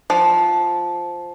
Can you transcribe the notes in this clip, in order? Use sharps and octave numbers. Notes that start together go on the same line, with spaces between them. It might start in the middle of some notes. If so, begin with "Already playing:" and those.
F3